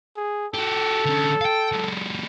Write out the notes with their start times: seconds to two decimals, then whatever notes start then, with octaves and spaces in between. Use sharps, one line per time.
0.17 G#4
0.54 F#4 G4 A4
1.06 D3 C#4
1.41 F5 G5
1.72 F#3 G#3